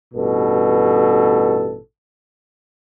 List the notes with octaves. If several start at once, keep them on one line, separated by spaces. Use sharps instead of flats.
A1 G2 B2 A4